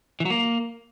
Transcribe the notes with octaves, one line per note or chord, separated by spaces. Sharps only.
E3
F#3
A#3